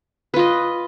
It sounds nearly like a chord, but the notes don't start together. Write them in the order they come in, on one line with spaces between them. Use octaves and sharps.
B4 F4 D#5